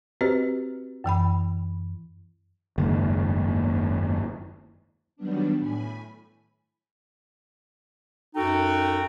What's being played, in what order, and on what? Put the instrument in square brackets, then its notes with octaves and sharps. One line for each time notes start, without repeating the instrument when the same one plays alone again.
[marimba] C4 F#4 G4 B4 C5 D#5
F#2 E3 G5 B5
[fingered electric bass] F#1 D#2 G#2
[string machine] D#3 F#3 G3 B3 D4
A2 G#5 B5
[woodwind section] F#2 D#4 F#4 A4 G5